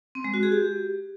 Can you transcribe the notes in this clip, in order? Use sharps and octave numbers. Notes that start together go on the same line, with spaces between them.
C4
G#3
F#4
G#4
G4